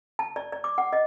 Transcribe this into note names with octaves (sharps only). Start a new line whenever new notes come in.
A5
D5
D5
D6
F#5
D#5